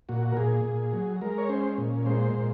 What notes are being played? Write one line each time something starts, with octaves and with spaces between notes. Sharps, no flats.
A#2 F#4
A#4
A#2 G#4
A#2
F#3
G#3 A#4
C#5
C#4 C5
A#2
G#3 C5
A#2